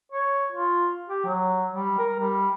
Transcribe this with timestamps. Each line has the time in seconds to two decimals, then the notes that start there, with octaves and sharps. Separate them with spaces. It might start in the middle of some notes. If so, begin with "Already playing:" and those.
0.12 C#5
0.52 F4
1.09 G4
1.25 F#3
1.72 G3
1.98 A#4
2.20 G3